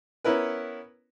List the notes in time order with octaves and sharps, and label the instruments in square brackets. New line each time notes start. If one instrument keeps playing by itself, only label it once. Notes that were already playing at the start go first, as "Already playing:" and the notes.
[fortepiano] B3 C#4 E4 A#4 B4